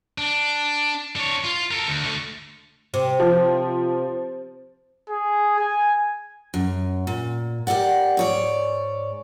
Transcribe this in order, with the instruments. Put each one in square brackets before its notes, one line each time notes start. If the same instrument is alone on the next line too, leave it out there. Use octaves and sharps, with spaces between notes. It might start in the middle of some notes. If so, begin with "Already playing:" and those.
[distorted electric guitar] D4
D4 C#5
F4
A4 A#4
D2
D3 A3
[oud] C3
[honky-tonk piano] F3
[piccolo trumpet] G#4
G#5
[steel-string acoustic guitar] F#2
A#2
G4 A4 A#4 D5 F#5
G#2 C#5 D5